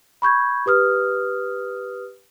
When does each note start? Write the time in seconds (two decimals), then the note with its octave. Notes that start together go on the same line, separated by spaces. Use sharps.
0.22 B5 C#6 G6 G#6
0.66 G4 B4 D#6 F6